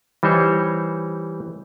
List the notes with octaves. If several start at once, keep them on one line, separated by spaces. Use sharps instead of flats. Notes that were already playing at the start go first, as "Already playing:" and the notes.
E3 G3 D#4 C5 C#5